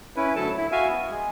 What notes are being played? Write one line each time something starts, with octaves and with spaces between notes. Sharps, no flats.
C#4 E4 B4
D2 F#3 A4 A5
E4
F#4 E5 F5 G#5
B3
G#3